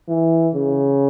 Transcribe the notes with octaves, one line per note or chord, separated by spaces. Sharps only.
E3
C#3